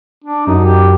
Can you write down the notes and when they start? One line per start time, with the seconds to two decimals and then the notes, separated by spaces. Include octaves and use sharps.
0.24 D4
0.47 F#2 D#4
0.64 G4